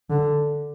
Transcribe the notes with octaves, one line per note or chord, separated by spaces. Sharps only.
D3